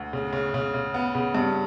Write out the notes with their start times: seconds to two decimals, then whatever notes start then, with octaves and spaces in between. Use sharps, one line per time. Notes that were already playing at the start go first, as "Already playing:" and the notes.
Already playing: D2
0.13 C#3
0.33 C#3
0.54 C#3
0.74 C#3
0.94 B3
1.15 C#3
1.35 G2